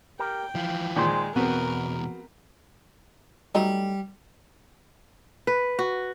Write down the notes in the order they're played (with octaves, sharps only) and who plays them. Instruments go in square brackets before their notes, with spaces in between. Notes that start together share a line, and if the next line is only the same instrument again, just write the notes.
[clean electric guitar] G4 A#4 [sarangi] G5
[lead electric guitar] E3 F4 [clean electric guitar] F3
[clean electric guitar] D#2 C5 C6 [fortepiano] A#2 D#3 [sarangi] G#3
[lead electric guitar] E2 B2 [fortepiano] B3 C4 [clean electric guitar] F#4 B4 F#5 [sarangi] A#4
[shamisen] F#3 A3 D#4 [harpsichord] G3
[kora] B4
F#4